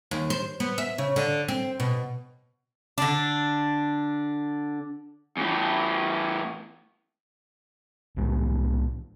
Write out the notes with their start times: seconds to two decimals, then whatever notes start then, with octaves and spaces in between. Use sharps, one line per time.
0.11 D#2
0.30 C5
0.60 B3
0.78 E5
0.98 C#3
1.16 D3
1.48 C4
1.80 B2
2.98 D3 D4
5.37 E2 A2
8.17 C2 A2 G#3 D4